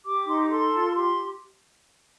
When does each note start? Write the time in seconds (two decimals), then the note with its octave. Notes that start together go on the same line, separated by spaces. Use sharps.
0.04 G4 D6
0.26 D#4 C6
0.38 D6
0.50 A4 C6
0.72 F4
0.95 G4 C6